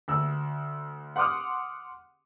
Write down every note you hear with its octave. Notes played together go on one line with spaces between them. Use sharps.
D2 E6
F#5 C6 D6 D#6 F6